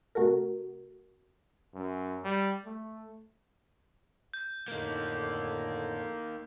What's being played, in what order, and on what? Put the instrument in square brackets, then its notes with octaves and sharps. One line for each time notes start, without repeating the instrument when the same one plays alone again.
[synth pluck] C3 A3 F#4 A4 A#4
[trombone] F#2
G3
A3
[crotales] G6
[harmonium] F2 A2 D3 [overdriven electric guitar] A#3 D#4